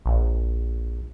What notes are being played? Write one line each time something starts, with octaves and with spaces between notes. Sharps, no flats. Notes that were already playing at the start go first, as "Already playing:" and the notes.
A#1